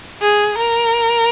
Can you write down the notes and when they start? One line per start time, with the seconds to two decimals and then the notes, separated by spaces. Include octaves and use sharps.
0.22 G#4
0.58 A#4